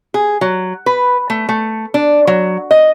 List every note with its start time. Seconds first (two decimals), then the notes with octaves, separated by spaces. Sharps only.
0.14 G#4
0.41 F#3
0.86 B4
1.30 A3
1.49 A3
1.94 D4
2.27 F#3
2.71 D#5